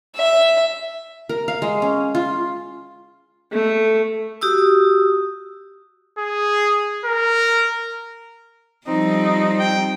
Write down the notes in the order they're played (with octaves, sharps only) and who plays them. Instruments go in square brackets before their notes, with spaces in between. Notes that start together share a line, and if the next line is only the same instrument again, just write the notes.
[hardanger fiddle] E5
[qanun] A#4
F5
G#3
C#4
F4
[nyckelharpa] A3
[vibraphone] F#4 G4 D#6 E6
[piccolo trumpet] G#4
A#4
[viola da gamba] F3 G3 [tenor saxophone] C4 [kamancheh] D#4
[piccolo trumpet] G5